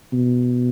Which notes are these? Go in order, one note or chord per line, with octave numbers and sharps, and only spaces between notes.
B2